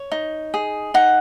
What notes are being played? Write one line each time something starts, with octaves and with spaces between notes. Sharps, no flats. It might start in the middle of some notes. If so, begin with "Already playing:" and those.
Already playing: C#5
D#4
G#4
D#4 F#5